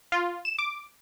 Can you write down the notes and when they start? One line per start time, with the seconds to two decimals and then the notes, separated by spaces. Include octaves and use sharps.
0.12 F4
0.45 E7
0.58 D6